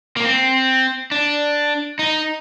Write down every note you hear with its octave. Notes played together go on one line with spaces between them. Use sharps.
A#3
C4
D4
D#4